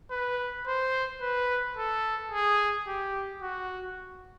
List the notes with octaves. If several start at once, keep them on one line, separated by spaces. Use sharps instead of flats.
B4
C5
B4
A4
G#4
G4
F#4